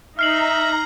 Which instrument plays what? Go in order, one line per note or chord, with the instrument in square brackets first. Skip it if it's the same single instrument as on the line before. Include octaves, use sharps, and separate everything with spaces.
[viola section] D#4 [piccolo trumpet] E5 [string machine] A#5 [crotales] F6 C7 F#7